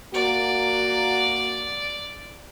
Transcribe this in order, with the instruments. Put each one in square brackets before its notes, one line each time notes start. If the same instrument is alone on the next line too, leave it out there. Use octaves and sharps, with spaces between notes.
[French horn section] A#3 F#4 [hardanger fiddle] D5